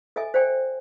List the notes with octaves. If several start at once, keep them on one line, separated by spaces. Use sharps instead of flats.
A4 D#5 E5 G#5
C5 D5 G5 G#5